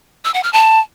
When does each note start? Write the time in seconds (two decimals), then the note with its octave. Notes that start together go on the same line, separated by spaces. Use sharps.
0.25 E6
0.34 F#5
0.44 F6
0.53 A5